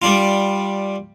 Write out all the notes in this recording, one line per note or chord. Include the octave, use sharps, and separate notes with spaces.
G3 D4 F4